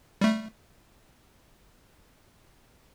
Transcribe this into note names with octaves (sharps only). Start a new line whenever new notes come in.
G3 A3